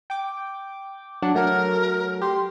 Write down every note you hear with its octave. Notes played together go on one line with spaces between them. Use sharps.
G5 D6
F#3 D4 F#5
F#3 A3 A#4
G4 C6